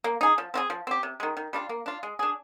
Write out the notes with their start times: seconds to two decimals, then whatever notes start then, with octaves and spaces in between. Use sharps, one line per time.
0.04 A#3
0.21 D#4 G#4
0.38 F3
0.54 C4 F4 G#4
0.70 F3
0.87 C4 G4
1.03 C3
1.20 D#3 G#3
1.37 D#3
1.53 G3 D4 F4
1.69 A#3
1.86 D4 F4
2.03 G#3
2.19 D4 G#4